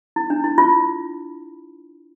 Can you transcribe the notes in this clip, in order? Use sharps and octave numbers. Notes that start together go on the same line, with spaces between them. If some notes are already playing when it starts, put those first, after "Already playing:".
E4
D4
E4
F4